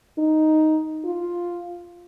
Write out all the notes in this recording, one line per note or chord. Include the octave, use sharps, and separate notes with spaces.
D#4
F4